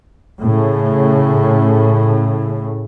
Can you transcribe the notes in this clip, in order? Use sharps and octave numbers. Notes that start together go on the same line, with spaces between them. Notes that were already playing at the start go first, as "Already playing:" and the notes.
A2 C#3